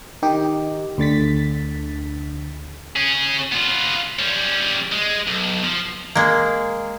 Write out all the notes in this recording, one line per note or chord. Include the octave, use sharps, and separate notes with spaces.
D#3 D#4 G4
D2 D3 A6 B6
C#4 G#4
B3 F4
G3 C#4
G#3
B1
F3
G#3 A#3